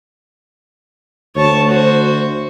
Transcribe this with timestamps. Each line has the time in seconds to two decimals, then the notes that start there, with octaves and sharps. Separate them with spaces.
1.36 D2 C#5 A5
1.69 F#4 C5